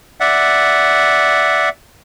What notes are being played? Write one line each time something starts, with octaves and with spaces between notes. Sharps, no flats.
D5 E5 F#5